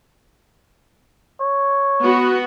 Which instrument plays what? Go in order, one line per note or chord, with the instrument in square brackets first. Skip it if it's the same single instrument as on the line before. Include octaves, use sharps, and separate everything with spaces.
[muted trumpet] C#5
[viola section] B3 F#4